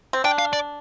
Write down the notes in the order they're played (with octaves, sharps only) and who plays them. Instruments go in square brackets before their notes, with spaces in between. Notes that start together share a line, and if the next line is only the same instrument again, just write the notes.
[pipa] C4
[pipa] D4 [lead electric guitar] G5
[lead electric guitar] F5
D5